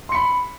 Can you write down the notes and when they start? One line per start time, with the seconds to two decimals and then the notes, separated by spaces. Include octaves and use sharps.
0.09 C6
0.12 C#7
0.15 B5